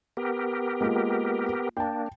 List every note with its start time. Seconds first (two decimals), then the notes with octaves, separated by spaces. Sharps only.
0.17 B3 G4 A#4
0.81 G#3 A#3 F4
1.77 A#3 D4 G5 A5